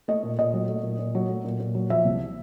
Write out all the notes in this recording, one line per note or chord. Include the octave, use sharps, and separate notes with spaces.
A3 D#5
A#2
A#2 D#5
F#3
A3
A#2
A#2
F#3
A3
A#2
A#2
F#3
F3 E5
C2